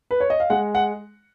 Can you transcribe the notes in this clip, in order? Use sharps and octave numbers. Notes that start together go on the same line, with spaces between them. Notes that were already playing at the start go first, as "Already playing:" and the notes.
B4
C#5
D#5
F5
G#3 F#5
F#5